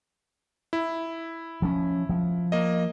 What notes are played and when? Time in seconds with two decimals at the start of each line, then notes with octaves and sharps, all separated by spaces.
0.73 E4
1.62 F3 C#4
2.09 F3
2.52 A#3 D#5